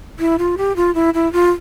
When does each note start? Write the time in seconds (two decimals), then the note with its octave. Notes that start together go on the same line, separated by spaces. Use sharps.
0.19 E4
0.38 F4
0.57 G4
0.76 F4
0.95 E4
1.14 E4
1.33 F4